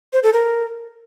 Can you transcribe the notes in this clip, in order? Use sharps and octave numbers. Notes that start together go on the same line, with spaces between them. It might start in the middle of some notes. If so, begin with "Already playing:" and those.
C5
A4
A#4